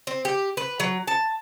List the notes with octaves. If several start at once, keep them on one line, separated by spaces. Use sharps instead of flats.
C4
G4
B4
F#3
A5